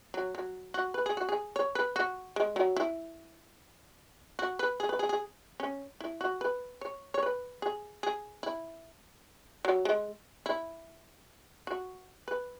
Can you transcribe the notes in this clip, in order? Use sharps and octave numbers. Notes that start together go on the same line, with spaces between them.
F#3
F#3
F#4
B4
G#4
F#4
G#4
C#5
B4
F#4
G#3
F#3
E4
F#4
B4
G#4
B4
G#4
G#4
C#4
E4
F#4
B4
C#5
C#5
B4
G#4
G#4
E4
F#3
G#3
E4
F#4
B4